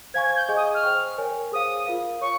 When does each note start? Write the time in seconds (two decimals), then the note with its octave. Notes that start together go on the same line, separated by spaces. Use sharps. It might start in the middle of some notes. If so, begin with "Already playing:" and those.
0.14 C5 F5 G#5 C#6 G#6
0.26 G#6
0.36 G6
0.49 G#4 D#5 G#5 C#6
0.57 D#6
0.74 F6
0.83 C5 G5 C#6
1.18 A#4 C#5 G#5
1.52 G#4 C5 F5 D#6
1.87 F4 A#4 F5
2.21 C#5 C#6